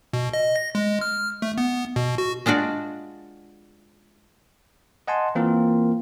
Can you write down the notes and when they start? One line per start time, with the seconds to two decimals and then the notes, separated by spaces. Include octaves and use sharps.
0.13 B2
0.34 D#5
0.56 A#6
0.75 G#3
1.01 F6
1.42 A3
1.58 B3
1.96 B2
2.18 F#4
2.46 G#3 D4 F4 F#4 D5
5.08 D#5 F#5 G#5 A5 C6
5.35 E3 A#3 C4 F4 A#4